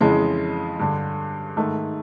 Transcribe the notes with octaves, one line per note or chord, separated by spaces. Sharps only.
F2 C#3 E3 G#3
G2 D3
G#2 D#3 A3